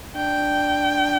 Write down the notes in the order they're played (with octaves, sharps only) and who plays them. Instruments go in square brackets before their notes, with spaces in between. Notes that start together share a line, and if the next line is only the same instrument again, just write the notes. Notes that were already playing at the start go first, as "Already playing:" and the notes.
[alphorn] D4 [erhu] G5